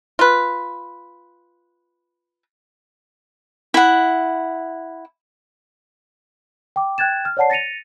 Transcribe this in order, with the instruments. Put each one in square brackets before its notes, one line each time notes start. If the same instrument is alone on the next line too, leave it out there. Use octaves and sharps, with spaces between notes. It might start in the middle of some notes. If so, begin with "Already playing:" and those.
[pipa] F4 B4
[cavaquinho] E4 F#5
[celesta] G5 D6
G5 F#6 G#6 A6 E7
F6
C#5 D5 F#5 A5 C7
A6 A#6 C#7 D#7 F7